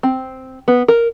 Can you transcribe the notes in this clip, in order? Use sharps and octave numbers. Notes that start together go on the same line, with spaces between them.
C4
B3
A#4